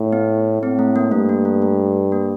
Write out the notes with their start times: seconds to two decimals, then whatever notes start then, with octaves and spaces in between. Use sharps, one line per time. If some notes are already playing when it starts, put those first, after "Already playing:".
Already playing: A2
0.13 B3
0.62 A2 C4
0.79 A3
0.96 A#3
1.12 G2 A3
1.29 A#3
1.45 A3
1.62 A3
2.12 A#3